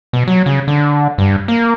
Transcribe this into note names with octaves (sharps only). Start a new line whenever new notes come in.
B2
F#3
C#3
D3
G2
A#3